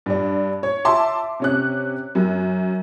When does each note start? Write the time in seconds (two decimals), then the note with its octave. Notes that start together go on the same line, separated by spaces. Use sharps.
0.06 G2 D4
0.63 C#5
0.85 E5 A5 C6 D6
1.40 C3 C#4 F#6
2.15 F#2